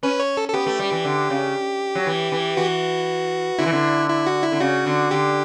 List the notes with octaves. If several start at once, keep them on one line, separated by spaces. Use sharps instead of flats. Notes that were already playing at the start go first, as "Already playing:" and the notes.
C#4 B4
C#5
A4
A4
B3 G4
A3
G3
E3
D3
C#3
F#3
E3
E3
E3 F#4
D3 E4
E3
D3
E4
F#4
E4
D3
C#3 F#4
D3
D3 G4